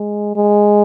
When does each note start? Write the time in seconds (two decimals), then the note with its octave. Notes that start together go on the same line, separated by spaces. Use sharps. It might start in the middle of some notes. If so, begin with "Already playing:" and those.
Already playing: G#3
0.36 G#3